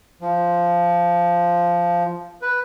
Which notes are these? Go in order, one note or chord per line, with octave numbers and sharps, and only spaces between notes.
F3
B4